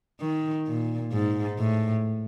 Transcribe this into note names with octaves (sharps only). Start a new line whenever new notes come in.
D#3
A#2
G#2
A2